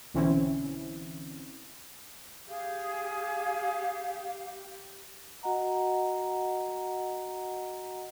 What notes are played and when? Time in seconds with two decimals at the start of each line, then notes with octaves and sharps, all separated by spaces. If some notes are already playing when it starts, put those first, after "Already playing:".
0.14 B1 D3 E3 C4 C#4 E4
2.48 G4 G#4 F5
5.43 F#4 D#5 F#5 A#5